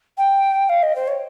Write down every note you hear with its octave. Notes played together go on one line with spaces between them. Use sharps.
G5
F5
D#5
C5
C#5